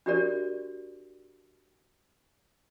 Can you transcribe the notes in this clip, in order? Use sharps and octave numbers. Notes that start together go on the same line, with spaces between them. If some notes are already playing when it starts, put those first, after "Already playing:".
D4 F#4 G4 A#4 D5